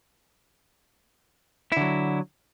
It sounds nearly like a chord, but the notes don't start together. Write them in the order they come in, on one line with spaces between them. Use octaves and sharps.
E4 D3 F#3